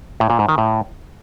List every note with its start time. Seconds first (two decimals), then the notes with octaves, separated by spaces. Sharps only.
0.20 A2
0.30 A#2
0.39 G#2
0.49 D#3
0.58 A2